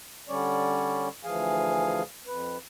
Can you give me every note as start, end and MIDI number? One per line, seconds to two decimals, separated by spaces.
0.29 1.08 50
0.29 1.08 55
0.29 1.08 61
0.29 1.08 73
0.29 1.08 74
1.24 2.02 38
1.24 2.02 52
1.24 2.02 53
1.24 2.02 68
1.24 2.02 77
1.24 2.02 80
2.27 2.57 41
2.27 2.57 71